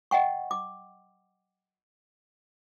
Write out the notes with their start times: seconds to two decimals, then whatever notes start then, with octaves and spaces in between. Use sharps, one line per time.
0.11 D#5 F#5 G5 C#6
0.51 D6